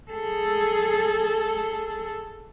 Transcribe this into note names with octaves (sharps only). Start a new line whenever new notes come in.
G#4 A4